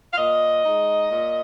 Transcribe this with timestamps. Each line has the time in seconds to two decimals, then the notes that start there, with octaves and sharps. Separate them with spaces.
0.13 F5
0.18 A#2 D#5
0.64 G#3 D#4
1.10 A#2